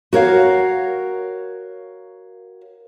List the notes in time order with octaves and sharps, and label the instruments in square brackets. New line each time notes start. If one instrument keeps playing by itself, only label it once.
[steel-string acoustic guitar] F#4 A#4 C#5 F5